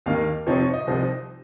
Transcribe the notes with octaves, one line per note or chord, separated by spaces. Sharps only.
D#2 D#3 A#3 D#4 F5
F2 C3 F3 C4 D#4 C#5
C#5
D#5
C2 C3 F3 C4 D#4